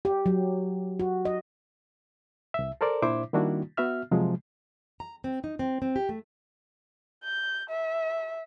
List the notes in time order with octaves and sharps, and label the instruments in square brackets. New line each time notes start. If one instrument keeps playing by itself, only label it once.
[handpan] G4
F#3
F#4
D#5
[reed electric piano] C2 E5
A4 A#4 C5 D5
A#2 D4 E4 C5 E5 D6
D#3 G3 A#3 D4 E4 F#4
B3 F#4 E5 F6
C3 F3 F#3 G#3
[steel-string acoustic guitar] A#5
C4
D#4
C4
C4
G4
A3
[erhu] G6
E5